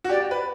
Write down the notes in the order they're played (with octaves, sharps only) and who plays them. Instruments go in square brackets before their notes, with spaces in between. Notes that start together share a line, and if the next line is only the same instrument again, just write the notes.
[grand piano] F#4
[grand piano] G4 [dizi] D5
[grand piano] G4
B4